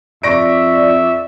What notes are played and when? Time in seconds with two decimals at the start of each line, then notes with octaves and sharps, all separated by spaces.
0.23 F2 D5 E5 C#6 A#6 D7